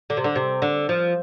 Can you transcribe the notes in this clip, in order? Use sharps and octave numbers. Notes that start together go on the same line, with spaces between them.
D3
C3
D3
C3
D3
F3